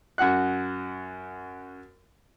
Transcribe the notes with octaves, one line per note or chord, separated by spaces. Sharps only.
F#2 F#4 F#5 F#6